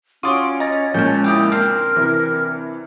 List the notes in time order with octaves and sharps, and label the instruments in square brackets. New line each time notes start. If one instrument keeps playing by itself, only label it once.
[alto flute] C#4 [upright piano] F4 F#4 [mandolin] D5 C6 D#6 [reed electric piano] C#6
[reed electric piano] D#5 A6 [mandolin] A#5
[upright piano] A#2 C#3 [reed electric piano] F3 G#3 A#3 [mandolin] G5 A5
[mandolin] C4 G4 D#5 [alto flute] E4
[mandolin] C4 D4 C6 [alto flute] A#4 [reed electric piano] F6
[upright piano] C3 E3